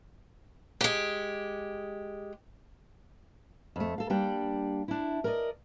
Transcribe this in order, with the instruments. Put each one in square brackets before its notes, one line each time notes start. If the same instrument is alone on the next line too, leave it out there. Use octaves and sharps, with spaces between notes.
[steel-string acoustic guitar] G#3 G4
F2 A3
A4 F5
G3 A#3 D4 D5 G5
D4 E4
A#4 D5 D#5